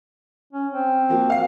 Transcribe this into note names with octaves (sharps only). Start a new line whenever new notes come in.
C#4
C4
F3 A#3 F#4
F5 C7